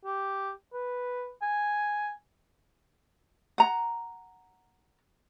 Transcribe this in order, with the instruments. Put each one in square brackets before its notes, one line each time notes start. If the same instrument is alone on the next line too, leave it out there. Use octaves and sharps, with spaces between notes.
[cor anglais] G4
B4
G#5
[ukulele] F#5 A#5